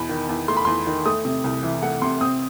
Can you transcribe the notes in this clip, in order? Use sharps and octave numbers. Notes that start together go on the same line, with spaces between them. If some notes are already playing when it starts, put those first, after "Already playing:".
Already playing: E2 B2 B5
D#3
E2
A3 C6
B5
E2 C6
D#3
A3 D#6
C3
C2
E3
A3 F#5
C3 C6
C4 D#6